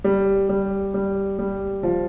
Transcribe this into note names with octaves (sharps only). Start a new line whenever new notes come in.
G3
G3
G3
G3
F3